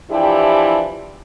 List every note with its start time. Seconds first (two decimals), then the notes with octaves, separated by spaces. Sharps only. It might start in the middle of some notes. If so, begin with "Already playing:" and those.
0.12 E3 F3 D4 E4 G4